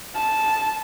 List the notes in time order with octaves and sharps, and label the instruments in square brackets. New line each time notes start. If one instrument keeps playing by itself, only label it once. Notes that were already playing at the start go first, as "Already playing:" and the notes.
[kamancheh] A5